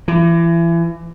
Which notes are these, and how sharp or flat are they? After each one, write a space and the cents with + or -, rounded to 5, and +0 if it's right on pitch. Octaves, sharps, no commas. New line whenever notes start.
E3 +30